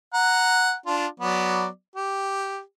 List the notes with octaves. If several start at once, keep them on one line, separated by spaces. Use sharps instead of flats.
F#5 A#5
D4 F4
F#3 B3 D5
G4